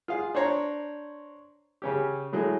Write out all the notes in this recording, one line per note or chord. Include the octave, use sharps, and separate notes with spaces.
F4 G#4 F5 F#5
D4 C5 C#5 A#5
C#3 C#4 G4
A2 F#3 G#3 A3